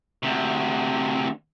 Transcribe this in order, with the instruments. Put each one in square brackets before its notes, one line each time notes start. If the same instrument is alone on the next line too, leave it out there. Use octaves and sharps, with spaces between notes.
[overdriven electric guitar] D2 C3